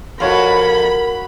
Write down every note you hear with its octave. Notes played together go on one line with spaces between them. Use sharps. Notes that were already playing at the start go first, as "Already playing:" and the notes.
F2 F#4 A#4 C#5 F5 B5